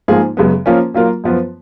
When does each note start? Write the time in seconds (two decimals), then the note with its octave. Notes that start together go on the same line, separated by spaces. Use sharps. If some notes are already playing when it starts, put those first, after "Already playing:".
0.08 G#2 F3 A#3 F4 G#4
0.37 F#2 C#3 G#3 B3
0.66 F3 A#3 C#4 F4 A#4
0.94 F#3 A#3 F4 A#4
1.24 F#2 F3 B3 F4